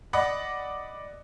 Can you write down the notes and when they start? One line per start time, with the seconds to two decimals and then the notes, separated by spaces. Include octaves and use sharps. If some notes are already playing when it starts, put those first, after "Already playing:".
0.13 D5 D#5 F#5 B5 D6